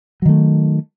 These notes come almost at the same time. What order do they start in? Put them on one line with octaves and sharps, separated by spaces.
F#3 D#3 A3